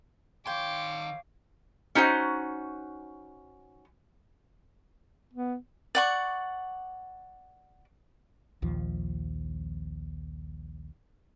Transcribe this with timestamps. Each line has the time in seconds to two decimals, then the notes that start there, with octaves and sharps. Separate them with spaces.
0.47 D#3 C#5 F5 G5 C6 D6
1.95 C#4 D#4 F#4 C5
5.33 B3
5.95 D5 F#5 C#6
8.62 A#1 D#2 F3